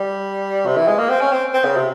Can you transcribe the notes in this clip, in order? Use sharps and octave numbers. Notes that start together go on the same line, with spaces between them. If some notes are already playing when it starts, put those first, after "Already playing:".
Already playing: G3
C3
E3
G#3
A#3
C4
C#4
C4
C4
C#3
C3